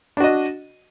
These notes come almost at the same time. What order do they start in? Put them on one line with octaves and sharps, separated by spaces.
D4 F#4 D#5